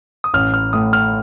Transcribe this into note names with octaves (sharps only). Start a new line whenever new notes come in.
D#6
A1 F6
F6
A2 A3 D#6
F6